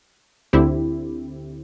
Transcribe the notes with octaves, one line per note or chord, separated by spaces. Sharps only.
D2 D3 C4 E4 G4